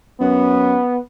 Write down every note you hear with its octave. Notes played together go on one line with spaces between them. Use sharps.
F#2 B3